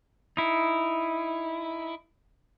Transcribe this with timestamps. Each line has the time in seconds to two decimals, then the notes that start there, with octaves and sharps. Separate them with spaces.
0.37 D#4 E4